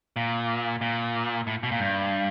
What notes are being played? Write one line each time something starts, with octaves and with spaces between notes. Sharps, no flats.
A#2
A#2
A2
B2
A#2
G2